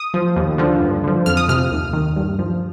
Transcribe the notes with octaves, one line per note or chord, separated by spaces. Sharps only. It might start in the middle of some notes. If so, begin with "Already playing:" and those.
Already playing: D#6
F3
D#2
D3 F3
G2
D3 F3
F2 F6
D#6
C3 F3 F6
D#2
D#3
G2
F3